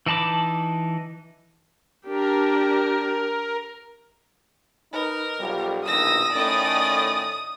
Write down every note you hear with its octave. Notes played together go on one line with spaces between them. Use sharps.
E3 D#4 A5 B5 D6
D4 G4 A#4
D#4 A#4 B4
B1 F3 G3
A#1 B2 D#3 D#6 E6 A#6
A2 D#3 C#4 D5 D#5